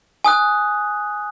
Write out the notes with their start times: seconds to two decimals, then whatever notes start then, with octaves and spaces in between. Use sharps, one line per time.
0.24 G#5 D#6 F#6